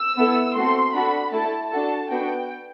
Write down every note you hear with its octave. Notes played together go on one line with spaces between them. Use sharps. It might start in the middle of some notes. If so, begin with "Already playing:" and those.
Already playing: E6
B3 E4 A4
A3 C4 F#4 A4 C6
D4 F#4 A4 B5
A3 E4 A4 A5
D4 F#4 A4 A5
B3 D4 F#4 G5